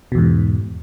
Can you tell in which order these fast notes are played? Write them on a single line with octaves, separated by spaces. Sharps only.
B2 E2 G#2